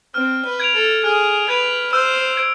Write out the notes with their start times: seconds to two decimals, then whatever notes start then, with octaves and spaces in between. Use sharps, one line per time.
0.14 C4 F6
0.45 B4
0.60 G#6 D7 F7
0.75 A4
1.04 G#4 F6
1.48 B4 G#6 D7 F7
1.92 C5 E6
2.37 G#6 D7 F7